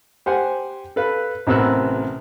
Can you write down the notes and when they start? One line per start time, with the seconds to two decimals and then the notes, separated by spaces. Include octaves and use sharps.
0.26 G4 C5 F#5 G#5
0.96 A4 B4 F5
1.47 A1 C3 B3 A#4 E6 F#6